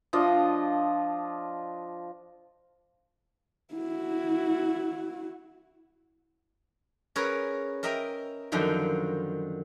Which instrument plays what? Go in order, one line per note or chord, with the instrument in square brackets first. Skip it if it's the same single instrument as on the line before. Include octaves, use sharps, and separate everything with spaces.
[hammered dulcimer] F3 D4 F4 D#5
[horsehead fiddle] E4 F#4
[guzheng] C#4 G#4 A#4 B4 C#5
A#4 D#5 E5 G5 A#5
F#2 D3 D#3 F3 B5